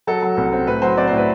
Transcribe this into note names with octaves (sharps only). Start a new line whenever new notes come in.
F#3 A4
F#3
C2
C4
A2 B4
F#3 C5
C4 D5
C5
A2
B4